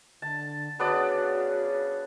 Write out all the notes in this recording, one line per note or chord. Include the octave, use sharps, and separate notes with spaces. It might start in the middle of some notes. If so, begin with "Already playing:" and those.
D3 A5
C#3 B3 D4 F#4 D5